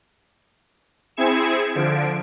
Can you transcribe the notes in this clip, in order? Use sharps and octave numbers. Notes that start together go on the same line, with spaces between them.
C4 E4 G#4 G#6 C#7 E7
D3 F3 D7